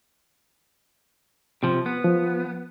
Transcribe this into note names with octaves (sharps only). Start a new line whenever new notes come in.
C3 F3
B3
F3